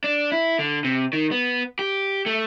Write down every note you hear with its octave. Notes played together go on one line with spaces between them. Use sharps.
D4
E4
D3
C3
D#3
B3
G4
A3